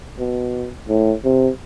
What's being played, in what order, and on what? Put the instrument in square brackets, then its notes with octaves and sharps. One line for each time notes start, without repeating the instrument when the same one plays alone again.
[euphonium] B2
A2
C3